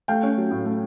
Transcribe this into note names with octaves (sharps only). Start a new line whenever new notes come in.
A3 F5 G5
C#4
F#3
A2
A3